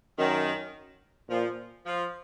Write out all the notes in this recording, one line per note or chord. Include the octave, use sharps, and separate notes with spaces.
F#2 D#3
A#2 F3
F3